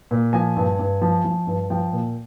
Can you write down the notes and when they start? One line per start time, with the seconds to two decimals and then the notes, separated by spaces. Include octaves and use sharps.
0.11 A#2
0.33 F3 G#5
0.57 G2
0.79 G2
1.02 F3
1.25 F3
1.47 G2
1.70 F3 G5
1.93 A#2